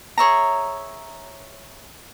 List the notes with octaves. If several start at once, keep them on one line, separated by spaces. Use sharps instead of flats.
G#4 C#5 E5 A#5